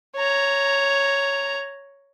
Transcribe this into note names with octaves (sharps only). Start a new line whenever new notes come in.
C#5 A#5